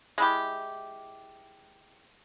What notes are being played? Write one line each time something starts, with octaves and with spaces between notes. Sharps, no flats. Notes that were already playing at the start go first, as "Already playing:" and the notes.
G#3 E4 G4